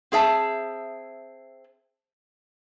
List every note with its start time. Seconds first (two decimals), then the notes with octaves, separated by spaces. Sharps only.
0.12 C4 G#4 E5 A5